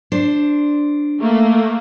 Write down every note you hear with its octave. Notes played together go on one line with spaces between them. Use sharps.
D4 C5
A3 A#3